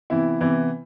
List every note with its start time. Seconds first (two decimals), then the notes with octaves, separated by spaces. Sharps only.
0.10 C3 E3 B3 E4
0.41 C3 E3 B3 E4